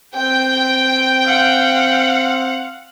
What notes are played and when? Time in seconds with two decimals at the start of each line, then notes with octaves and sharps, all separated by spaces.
0.16 C4 G5
1.25 F5 F#5